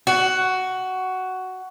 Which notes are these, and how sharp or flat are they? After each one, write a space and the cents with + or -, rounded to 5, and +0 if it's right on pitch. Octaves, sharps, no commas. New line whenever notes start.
F#4 +10